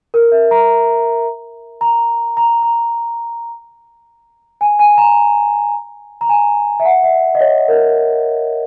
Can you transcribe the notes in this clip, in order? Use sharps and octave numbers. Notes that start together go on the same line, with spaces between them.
A#4
E5
A#5
A#5
A#5
A#5
G#5
G#5
A#5
A#5
G#5
E5
F#5
E5
D#5
C#5
A#4